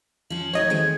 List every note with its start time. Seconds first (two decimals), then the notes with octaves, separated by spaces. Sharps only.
0.30 F3 C#4 F#7
0.53 F#3 A3 D#4 C#5 D#5 G#6
0.70 D#3 G#3 A3 C4